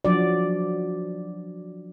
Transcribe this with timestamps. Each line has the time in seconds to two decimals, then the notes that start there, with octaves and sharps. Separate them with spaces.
0.05 F3 F#3 D4 F#4 D5